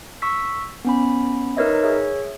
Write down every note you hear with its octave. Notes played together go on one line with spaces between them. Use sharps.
C#6 E6 B6
B3 C#4 B5
D#4 A#4 B4 C#5 D#5 E5
G#4 C#5 E5